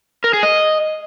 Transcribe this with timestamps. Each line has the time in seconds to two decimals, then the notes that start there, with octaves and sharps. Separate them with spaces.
0.24 A#4
0.33 G#4
0.43 D#5